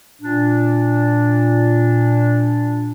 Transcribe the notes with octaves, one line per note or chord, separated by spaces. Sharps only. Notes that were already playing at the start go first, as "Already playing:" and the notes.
A#2 D4